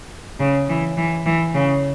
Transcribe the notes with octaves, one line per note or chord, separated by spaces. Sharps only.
C#3
E3
E3
E3
C#3